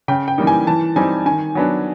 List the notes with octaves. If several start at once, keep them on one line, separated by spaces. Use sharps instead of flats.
C#3 G5
G5
E3 G3 A#3 D#4
G#5
E3 A5
G3 C4 D#4 G#5
D#3 G#5
F#3 B3 D4